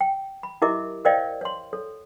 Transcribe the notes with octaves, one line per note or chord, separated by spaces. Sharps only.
G5
B5
E4 G4 A#4 D#5 E5 D6
A#4 C5 D5 D#5 F5 G5
C#5 C6
A4 C#5